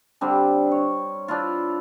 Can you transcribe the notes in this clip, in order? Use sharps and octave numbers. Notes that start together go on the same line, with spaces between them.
D3 G3 C4 D4
C#5
D4 E4 F4